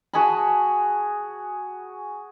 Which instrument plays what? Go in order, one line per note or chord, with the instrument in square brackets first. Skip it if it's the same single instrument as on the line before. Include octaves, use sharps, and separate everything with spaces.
[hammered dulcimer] F#4 G#4 A5 B5